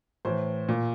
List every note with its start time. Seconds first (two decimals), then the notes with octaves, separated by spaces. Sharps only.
0.25 A2 E3 C5
0.69 A#2